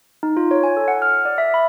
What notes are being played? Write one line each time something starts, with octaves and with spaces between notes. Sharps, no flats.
D#4
F4
C#5
G#5
A4
F#5
F6
D5
E5
B5